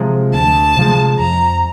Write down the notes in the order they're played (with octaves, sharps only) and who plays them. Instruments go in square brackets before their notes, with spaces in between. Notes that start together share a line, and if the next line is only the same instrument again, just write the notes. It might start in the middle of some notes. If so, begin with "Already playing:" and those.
Already playing: [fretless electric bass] C3 F3 G#3
[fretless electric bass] D2 [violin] A5
[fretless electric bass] C3 F3 G#3
[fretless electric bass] F2 [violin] A#5